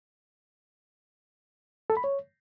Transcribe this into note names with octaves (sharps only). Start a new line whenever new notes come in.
A4
B5
C#5